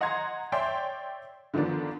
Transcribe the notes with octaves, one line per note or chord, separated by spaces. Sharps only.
D#5 F#5 A#5 C6 G#6
C#5 D5 E5 G5 C6
D3 D#3 F3 B3 D4